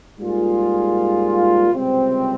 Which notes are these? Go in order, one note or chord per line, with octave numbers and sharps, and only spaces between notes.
G#2 G3 A#3 F4 G#4
C#2 C3 G3 C4